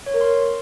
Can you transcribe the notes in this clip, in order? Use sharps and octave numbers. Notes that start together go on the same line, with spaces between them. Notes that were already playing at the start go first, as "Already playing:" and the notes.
C#5
A#4
C6